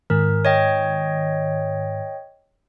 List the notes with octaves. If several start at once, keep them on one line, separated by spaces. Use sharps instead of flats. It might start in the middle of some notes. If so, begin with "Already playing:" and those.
G#2 D#3 A#4
C#5 D#5 G5